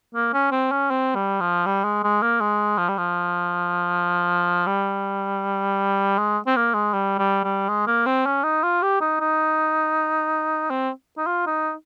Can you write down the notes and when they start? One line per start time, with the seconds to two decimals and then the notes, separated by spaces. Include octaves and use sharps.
0.15 A#3
0.33 C#4
0.51 C4
0.71 C#4
0.90 C4
1.15 G3
1.40 F3
1.66 G3
1.84 G#3
2.04 G#3
2.22 A#3
2.41 G#3
2.78 F3
2.88 G3
2.97 F3
4.66 G3
6.18 G#3
6.46 C4
6.56 A#3
6.74 G#3
6.93 G3
7.19 G3
7.44 G3
7.69 G#3
7.87 A#3
8.06 C4
8.26 C#4
8.44 D#4
8.63 F4
8.82 G4
9.01 D#4
9.20 D#4
10.70 C4
11.17 D#4
11.26 F4
11.46 D#4